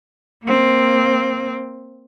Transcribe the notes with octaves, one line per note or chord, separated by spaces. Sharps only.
A#3 C4